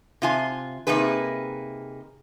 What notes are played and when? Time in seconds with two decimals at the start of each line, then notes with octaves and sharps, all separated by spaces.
0.22 C3 F4 G#5
0.87 C3 A#3 D#4 G#4 B4